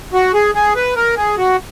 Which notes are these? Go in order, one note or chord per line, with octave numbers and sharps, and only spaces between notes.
F#4
G#4
G#4
B4
A#4
G#4
F#4